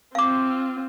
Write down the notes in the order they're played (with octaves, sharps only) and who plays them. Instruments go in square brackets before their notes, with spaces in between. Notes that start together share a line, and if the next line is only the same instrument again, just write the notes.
[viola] C4 F4 [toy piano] F5 D6